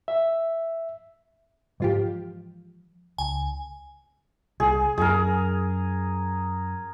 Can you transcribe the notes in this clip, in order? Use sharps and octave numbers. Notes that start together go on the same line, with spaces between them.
E5
G#2 E3 F3 G#3 F4 G4
C#2 G#5
C2 G#4
F#2 G#4 A#4